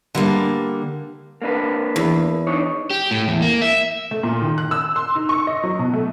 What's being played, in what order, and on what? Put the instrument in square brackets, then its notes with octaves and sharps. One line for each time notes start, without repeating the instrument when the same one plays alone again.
[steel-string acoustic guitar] D3 G3 A#3
[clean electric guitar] A#3 D4 B4
[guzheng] E2
[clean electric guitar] D4 D#4 C#5
[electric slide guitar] G4
A2
E2
A#3
E5
[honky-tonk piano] A3
A#2
D#3
F#6
E6
C6
D#4
C#6
D#5
F#3
B2
A3